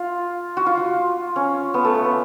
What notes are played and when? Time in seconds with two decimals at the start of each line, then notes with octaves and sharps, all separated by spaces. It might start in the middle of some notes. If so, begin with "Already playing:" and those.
Already playing: F4
0.57 F#4
0.66 F4
0.77 F4
1.36 C#4
1.74 B3
1.84 A3
1.95 A3
2.05 B3